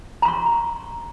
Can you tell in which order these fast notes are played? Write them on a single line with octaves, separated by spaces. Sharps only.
A#5 C6 C#6